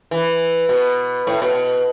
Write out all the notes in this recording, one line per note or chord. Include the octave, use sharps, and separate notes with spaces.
E3
B2
A2
B2